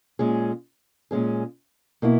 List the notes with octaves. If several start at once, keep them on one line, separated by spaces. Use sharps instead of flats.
A#2 G#3 C#4 G#4
A#2 G#3 C#4 G#4
B2 A#3 E4